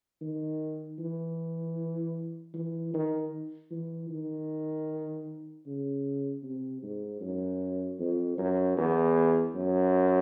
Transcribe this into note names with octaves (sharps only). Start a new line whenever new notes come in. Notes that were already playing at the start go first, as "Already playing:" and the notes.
D#3
E3
E3
D#3
E3
D#3
C#3
C3
G#2
F#2
F2
F#2
E2
F#2